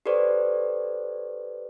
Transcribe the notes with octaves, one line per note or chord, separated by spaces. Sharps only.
G4 A4 B4 C5 D5